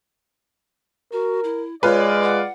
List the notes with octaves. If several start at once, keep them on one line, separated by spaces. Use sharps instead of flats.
F#4 A#4
E4
G#3 F4 B4 C#5 D5
F#5